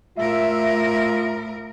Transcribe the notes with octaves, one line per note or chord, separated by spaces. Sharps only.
A2 F4 A#4 E5